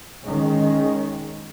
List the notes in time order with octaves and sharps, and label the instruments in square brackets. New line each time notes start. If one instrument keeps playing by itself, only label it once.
[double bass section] D#3 G#3 C#4